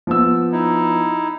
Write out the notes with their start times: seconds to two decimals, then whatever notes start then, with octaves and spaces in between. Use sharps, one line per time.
0.07 F3 B3 E6
0.52 D#4 E4